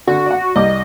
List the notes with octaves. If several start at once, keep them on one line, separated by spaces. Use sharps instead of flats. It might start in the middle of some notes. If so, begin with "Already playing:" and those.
D3 F#4
D5 F#5
C2 G3 D#5 D6